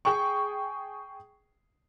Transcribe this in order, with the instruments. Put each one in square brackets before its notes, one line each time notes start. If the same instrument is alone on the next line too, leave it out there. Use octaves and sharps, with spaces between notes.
[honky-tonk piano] G#4 G5 C#6